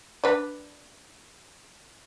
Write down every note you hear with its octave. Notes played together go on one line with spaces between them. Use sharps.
D4 B4 D5